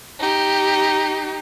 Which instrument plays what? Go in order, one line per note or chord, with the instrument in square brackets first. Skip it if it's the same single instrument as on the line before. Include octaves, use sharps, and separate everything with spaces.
[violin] D#4 G4